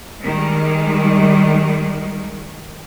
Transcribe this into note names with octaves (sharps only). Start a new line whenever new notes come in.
D#3 G3 G#3